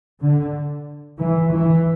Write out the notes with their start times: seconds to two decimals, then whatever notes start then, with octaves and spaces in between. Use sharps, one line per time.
0.20 D3
1.21 E3
1.53 E3